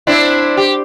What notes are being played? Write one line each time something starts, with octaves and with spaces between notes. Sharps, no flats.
C4 D4 E4
G4